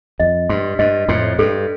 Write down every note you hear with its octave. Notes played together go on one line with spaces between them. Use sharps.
F2 D#5
G2 C6
G2 D#5
F2 A2 C6
G2 A4